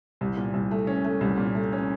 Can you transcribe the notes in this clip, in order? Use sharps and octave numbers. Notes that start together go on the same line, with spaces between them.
C2
A#2
C2
A3
C#4
A3
C2
A#2
A3
C#4